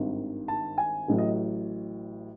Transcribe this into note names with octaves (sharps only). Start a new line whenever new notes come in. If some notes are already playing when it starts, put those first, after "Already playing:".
Already playing: G#1 G2 D#3
A5
G#5
A1 A2 F#3
D#5